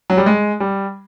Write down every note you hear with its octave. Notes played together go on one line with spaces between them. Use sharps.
F#3
G3
G#3
G3